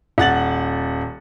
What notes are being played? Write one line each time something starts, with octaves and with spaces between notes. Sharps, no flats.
D#1 F#5 A6 F#7